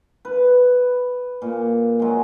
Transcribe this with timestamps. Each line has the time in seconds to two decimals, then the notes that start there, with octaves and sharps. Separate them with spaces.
0.25 B4
1.42 A#2
2.00 F#3 G#3